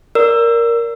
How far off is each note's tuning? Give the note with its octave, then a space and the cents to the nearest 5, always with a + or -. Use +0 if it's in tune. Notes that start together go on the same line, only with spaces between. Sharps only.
A#4 +0 D5 -20 E6 +20